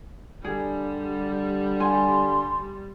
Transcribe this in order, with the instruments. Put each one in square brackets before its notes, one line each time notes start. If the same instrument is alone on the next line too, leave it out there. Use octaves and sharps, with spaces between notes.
[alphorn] D3 [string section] G3 [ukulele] G#4
[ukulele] G#5 [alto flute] C6